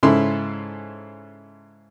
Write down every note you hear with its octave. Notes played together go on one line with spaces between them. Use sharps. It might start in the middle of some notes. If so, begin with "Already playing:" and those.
G#2 C#3 C#4 E4 A4 C6